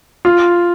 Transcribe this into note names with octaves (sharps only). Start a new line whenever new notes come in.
F4